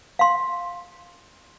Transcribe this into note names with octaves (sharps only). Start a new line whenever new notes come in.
F5 C6